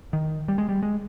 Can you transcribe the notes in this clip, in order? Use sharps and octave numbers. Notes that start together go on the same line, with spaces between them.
D#3
G3
G#3
G3
G#3